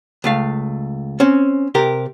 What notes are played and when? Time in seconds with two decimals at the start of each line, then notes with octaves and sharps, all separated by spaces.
0.24 C#2 A3 F5
1.20 C4 C#4
1.75 C3 G4 A#4